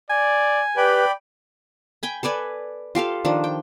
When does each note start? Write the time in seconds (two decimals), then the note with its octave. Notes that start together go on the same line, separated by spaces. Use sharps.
0.10 D5 G#5
0.77 G4 B4 D5 G5 B5
2.03 G5 G#5 B5
2.23 A4 B4 D5 G#5
2.95 F4 G4 A4 F5
3.25 D#3 F3 D4
3.44 G5